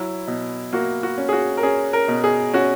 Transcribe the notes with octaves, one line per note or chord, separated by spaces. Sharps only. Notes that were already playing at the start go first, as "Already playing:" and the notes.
Already playing: F#3 E4
B2
A#3 F#4
F#4
C#4
G#4
F#4
A#4
C#4 G#4
A#4
B2
G#4
C#4 F#4